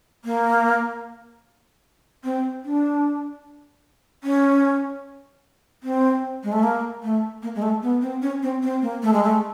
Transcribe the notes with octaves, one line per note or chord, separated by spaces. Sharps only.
A#3
C4
D4
C#4
C4
G#3
A3
A#3
A3
A#3
G#3
A3
B3
C4
C#4
C4
C4
A#3
A3
G#3
A3